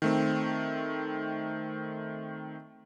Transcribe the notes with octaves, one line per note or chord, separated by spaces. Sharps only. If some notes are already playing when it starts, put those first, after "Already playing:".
D#3 A3 C4